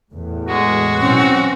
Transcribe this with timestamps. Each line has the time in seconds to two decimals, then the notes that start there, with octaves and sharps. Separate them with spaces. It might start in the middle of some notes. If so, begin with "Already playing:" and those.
0.12 E2 A2
0.48 G#3 F#4
1.02 B2 E3 F#3 C4 C#4